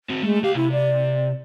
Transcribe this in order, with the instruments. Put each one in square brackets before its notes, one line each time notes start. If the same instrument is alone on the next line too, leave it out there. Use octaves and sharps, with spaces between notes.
[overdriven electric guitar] C4 F#4
[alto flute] G#3 [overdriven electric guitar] A3
[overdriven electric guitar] C#2 F5 [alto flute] G4
[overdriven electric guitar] C3 [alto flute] E4
[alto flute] D5